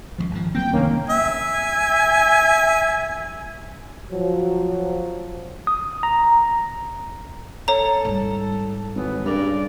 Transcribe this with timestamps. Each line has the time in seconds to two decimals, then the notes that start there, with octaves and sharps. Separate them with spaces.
0.18 C#2 G2 F3
0.31 G#1 F3
0.55 F#3 A#3 C4 G5
0.72 C2 G2 D#3 A#3 C#4
1.10 E5 G#5
4.11 F3 F#3
5.67 D#6
6.03 A#5
7.68 A4 C#5 A#5
8.05 G#2 G3
8.95 G#1 E3 F#3 B3
9.25 G2 C#3 A#4 D5